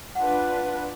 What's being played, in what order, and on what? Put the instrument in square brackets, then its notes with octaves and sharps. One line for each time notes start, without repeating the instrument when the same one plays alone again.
[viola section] D4 F4 B4 [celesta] F#5